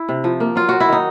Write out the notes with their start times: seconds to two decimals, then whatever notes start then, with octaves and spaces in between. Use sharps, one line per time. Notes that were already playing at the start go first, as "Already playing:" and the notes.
Already playing: E4
0.09 C3
0.24 F3
0.40 A#3
0.56 F#3 F4
0.69 F#3 F#4
0.80 E4
0.89 D#3 D#4